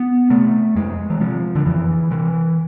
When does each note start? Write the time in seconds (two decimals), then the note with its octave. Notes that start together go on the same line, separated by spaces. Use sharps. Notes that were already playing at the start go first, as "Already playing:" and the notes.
Already playing: B3
0.30 C3 A3
0.76 F2 G#3
1.10 E3
1.20 C3 F3
1.55 D3
1.65 F2 E3
2.11 C3 E3